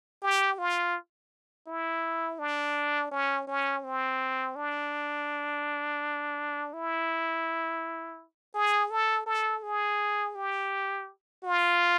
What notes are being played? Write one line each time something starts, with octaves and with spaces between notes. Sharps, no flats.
G4
F4
E4
D4
C#4
C#4
C4
D4
E4
G#4
A4
A4
G#4
G4
F4